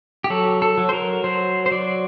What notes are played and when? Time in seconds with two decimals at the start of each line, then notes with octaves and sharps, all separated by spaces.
0.24 G4
0.30 F#3 A4
0.62 A4
0.78 F#3
0.89 C5
0.93 A#4
1.24 F#3 C5
1.66 C5
1.71 F#3 D5